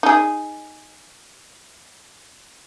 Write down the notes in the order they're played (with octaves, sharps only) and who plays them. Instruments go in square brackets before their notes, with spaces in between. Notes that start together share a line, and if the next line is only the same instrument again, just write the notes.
[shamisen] D#4 G#4